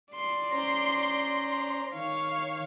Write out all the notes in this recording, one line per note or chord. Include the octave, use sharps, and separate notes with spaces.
D5 C6
C#4 C5 A#5
D#3 C#5 F5